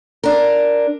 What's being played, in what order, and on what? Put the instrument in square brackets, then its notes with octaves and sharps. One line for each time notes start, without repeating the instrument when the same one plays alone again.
[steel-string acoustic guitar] D4 A#4